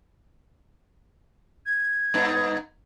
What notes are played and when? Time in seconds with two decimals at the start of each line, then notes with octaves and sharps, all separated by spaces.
1.66 G#6
2.14 G2 B3 D#4